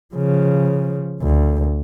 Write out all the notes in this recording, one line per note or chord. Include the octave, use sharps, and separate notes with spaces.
C#3 F3
D2